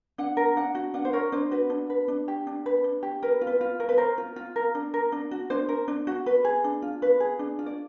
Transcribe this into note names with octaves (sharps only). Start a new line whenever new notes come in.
D4 F#5
A#4
D4 F#5
F#4
D4 F#5
C5
A#4 C#5
D4 C5
F#4 B4
D4
B4
D4
G4
D4
B4
D4
G4
A#4 B4
F4
B4
F4
A#4
B4
A#4 C5
F4
F4
A#4
D4
A#4
D4
F#4
D4 C5
A#4
D4
F#4
B4
G#4
D4
F4
B4
G#4
D4
F4
D5